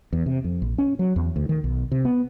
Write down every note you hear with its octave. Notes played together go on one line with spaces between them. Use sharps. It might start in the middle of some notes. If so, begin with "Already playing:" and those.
E2
C3
F2
A#1
C#4
F#3
E2
D2
D#3
B1
C3
B3